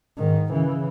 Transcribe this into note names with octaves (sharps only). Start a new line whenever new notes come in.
G#2 D#3
C#3 E3